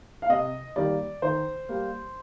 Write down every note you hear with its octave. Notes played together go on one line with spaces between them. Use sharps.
F5
C3 D#5
D#3 G3 A#3 D5
D#3 C5
G3 A#3